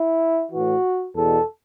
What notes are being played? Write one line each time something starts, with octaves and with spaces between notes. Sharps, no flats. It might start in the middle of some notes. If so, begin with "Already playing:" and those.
Already playing: E4
A2 E3 F#4
E2 B2 A4